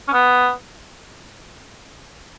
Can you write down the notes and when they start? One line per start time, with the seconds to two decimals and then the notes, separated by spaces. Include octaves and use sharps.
0.08 C#4
0.13 B3